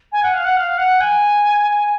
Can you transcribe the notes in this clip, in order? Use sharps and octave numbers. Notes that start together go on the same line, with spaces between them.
G#5
F#5
F5
F#5
F5
F#5
G#5